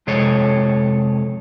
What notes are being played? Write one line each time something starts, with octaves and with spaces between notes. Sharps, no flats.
F2 C3 G#3 A4 C#5